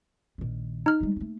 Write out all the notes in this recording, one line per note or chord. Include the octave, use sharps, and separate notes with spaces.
A#1 D#3
D#4 F6
G3 G#3
A3 A#3